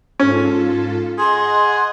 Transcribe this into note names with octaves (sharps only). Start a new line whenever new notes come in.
G#2 C#4 F4 A4
G#4 D#5 F#5 C6